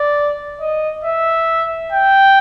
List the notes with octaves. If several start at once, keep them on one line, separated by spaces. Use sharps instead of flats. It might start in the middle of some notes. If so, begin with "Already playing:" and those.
Already playing: D5
D#5
E5
G5